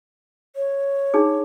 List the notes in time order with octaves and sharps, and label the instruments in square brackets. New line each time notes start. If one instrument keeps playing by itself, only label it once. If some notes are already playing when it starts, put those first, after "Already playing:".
[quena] C#5
[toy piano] D4 D#4 G#4